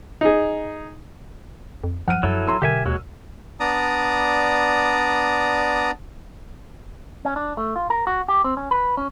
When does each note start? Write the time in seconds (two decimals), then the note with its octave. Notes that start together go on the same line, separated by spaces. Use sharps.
0.21 D#4 G#4
1.84 F2
2.08 F#2 F3 F#5 F6 D#7
2.23 F#2 F#3 E4 A4
2.47 A#5 C6 E6
2.62 B1 D3 G4 A#4 E5 G#5
2.86 D#2 F#3 G#3 F#4
3.60 B3 D4 D5 A#5 D#6
7.25 C#4
7.36 D4
7.57 A3
7.76 F4
7.90 A#4
8.07 F#4
8.28 G4
8.44 C4
8.57 C#4
8.71 B4
8.97 C#4